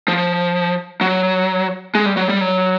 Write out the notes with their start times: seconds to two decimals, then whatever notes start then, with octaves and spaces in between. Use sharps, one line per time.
0.08 F3
1.01 F#3
1.95 G#3
2.06 G3
2.17 F#3
2.29 G3
2.41 F#3